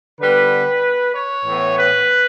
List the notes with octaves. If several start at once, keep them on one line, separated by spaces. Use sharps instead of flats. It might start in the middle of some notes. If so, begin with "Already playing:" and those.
D3 G3 B3 B4
C#5
A2 E3 B3
B4